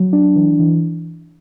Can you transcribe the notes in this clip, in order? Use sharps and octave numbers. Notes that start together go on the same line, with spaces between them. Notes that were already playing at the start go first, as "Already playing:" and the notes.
Already playing: F#3
D4
E3
E3